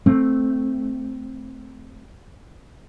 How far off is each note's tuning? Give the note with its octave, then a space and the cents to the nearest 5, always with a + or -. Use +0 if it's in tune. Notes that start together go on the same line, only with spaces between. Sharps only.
A3 +0 C4 +0